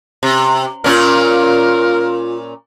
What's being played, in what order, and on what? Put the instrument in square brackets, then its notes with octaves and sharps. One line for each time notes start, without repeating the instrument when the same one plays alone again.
[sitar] C3
[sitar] A#2 C#4 [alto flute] F4 [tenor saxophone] A#4